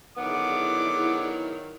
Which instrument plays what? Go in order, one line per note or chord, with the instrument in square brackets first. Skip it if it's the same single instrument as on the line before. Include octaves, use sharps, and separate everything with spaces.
[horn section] D3 B3 [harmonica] D#3 F#3 [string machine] E4 G#4 D5 [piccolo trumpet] D6